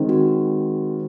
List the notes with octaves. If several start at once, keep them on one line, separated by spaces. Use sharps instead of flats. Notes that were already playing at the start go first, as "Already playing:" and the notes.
Already playing: D#3 G#3 C4
F#4